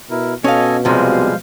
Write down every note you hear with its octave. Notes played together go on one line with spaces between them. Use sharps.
B2 E4 A#4
B2 C#4 A4 D#5 F5 G#5
B1 C3 F3 G3 G#3 C5 F5